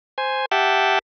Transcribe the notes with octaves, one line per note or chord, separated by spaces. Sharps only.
C5 G#5
G4 E5 F#5 G5 A5